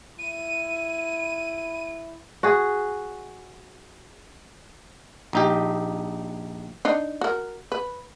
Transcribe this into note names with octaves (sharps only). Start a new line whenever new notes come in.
E4 D#7
F#4 G#4
A#1 D#4 G4
D4 D#4
F#4 A#4
B4